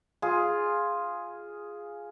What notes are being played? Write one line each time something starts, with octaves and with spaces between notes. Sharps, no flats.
F4 G#4